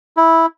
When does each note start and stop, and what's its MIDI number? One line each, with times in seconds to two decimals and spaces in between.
0.17 0.46 64